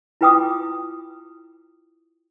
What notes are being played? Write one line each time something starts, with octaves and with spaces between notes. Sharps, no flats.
E4 F4 B4 G5 D6 D#6